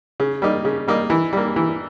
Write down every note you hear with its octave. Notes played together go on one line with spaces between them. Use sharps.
C#3
G3 A#3 D#4
C#3
G3 A#3 D#4
E3
G3 A#3
E3